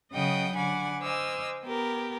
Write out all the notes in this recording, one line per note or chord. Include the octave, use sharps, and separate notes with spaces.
C#3 F#3 D#5 F#5 G5 D#6
D3 F#5 G#5 B5 D6
C5 D#5 G#5 D6 E6 F6
B3 G4 A#4